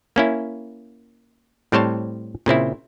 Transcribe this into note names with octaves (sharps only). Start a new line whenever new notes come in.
A#3 C#4 E4
A2 G3 C4 C5 C#5 A5
A#2 C#3 C4 E4